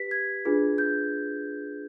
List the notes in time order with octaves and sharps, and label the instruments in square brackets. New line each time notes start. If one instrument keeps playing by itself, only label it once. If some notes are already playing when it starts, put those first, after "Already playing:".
Already playing: [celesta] G4 B4 B6
G#6
D4 F4 G#4 B4
G6